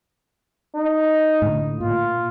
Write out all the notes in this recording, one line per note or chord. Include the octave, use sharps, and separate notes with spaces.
D#4
A2 D3
A#2 F4